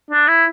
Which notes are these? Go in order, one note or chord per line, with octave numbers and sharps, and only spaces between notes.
D4
E4